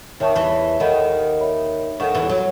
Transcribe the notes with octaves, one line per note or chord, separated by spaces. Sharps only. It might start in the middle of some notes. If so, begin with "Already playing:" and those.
D#2 D#3 C#5 E5 A5 C#6
E2 E3
D#2 D#3 A4 D#5 F#5 B5
C#5 E5 B5
D#2 D#3 A4 C#5 F#5 C#6
E2 E3
F#3